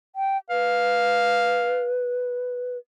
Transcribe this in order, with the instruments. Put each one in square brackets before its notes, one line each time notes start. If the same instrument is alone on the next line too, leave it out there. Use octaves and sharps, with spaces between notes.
[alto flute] G5
[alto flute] B4 [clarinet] F5